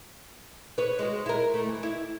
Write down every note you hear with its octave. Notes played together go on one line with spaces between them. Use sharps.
B4 C#5
G#3 F#4
E4 A#4
A3
E3
E4